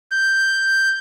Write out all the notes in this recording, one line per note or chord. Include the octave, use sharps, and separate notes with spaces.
G6